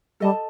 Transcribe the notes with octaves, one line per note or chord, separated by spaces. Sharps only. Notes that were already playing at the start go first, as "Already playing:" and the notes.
G3 A4 D#5 A5